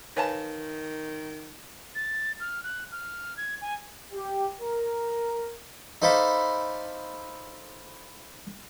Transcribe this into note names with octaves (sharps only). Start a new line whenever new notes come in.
D#3 B4 C#5 F5 G#5 A5
A6
F6
F#6
F6
G#6
G#5
G4
A#4
D#4 A4 C5 F5 B5 D6